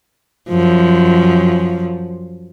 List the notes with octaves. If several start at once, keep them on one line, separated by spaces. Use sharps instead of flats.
F#2 F3